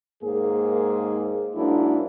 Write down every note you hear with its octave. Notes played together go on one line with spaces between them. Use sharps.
D#2 G#2 A#3 G#4
G#2 F#3 A#3 D4 E4